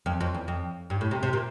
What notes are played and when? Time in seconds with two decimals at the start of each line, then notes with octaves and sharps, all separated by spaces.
0.06 F2
0.21 F2
0.34 E2
0.48 F2
0.90 G2
1.01 A2
1.11 C3
1.23 C3
1.33 A#2